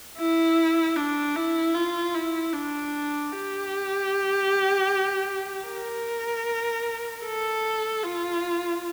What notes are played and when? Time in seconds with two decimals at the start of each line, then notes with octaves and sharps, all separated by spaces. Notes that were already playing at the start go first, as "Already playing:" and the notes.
0.18 E4
0.96 D4
1.36 E4
1.75 F4
2.14 E4
2.53 D4
3.32 G4
5.67 A#4
7.25 A4
8.03 F4